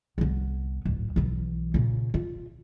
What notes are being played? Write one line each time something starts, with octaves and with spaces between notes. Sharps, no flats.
C2 B3
D1 G#1
B1 E3
A#2 C#3
F4